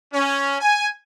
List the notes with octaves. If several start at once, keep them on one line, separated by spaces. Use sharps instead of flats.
C#4
G#5